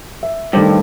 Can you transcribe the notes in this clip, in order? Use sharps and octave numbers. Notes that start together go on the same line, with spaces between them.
E5
G2 D#3 A3 C5